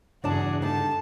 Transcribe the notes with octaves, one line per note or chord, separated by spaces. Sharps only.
E2 G2 C#3 D4 F#4 G#4 D5 A5
D3 G3 D#4 A5